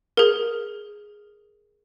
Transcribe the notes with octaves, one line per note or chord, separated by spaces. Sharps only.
G#4 A#4